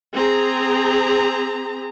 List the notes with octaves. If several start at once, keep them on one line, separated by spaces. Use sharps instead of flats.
C4 G#4 A#5